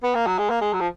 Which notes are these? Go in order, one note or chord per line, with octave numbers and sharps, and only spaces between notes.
B3
A#3
F#3
G#3
A#3
G#3
F#3
F3